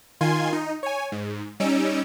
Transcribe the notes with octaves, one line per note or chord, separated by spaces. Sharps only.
D#3 F4 G#5 C6 G#6
D#4
C#5 G#5
G#2
G3 C#4 D#4 E6 D7